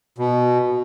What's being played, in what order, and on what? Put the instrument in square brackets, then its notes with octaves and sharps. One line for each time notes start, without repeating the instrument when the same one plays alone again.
[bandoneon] B2